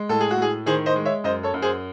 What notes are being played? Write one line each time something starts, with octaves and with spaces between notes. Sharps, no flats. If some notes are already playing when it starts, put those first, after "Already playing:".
Already playing: G#3
A2 A4
G#4
F#4
A2 G#4
D#3 G#4 C5
C5 D#5
G#3
C#5 E5
F#2 C5 D#5
A4 C#5
F#2
G#4 C5